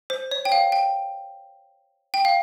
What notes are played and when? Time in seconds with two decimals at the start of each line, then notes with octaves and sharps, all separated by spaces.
0.10 C5
0.31 C#5
0.45 G5
0.52 F5
0.72 G5
2.14 G5
2.25 F5